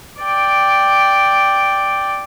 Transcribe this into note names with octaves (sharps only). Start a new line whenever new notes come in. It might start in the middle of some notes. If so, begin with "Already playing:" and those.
D5 G5